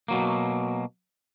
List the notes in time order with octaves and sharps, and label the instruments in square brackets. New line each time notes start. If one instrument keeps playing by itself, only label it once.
[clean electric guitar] B2 F#3 A#3